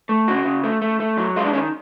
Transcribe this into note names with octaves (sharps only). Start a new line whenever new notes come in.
A3
C#3 F#4
C#3
A3
A3
A3
F#3
G#3 F4
D4
D#3 C#4